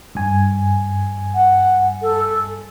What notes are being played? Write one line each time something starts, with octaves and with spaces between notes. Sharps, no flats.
G2 G#5
F#5
A4